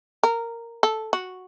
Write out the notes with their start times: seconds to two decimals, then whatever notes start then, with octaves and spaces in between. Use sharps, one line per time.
0.23 A#4
0.83 A4
1.13 F#4